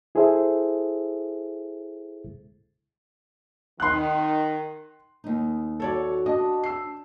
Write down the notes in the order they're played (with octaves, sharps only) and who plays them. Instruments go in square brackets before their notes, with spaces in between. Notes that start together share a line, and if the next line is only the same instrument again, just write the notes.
[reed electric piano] E4 G#4 A4 C5 E5
[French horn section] D#3 [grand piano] C6 F#6
[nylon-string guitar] D#2 D#4
[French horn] F#4 [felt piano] A4 C#5 D5
[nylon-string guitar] D4 [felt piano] D#5
[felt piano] E6 C7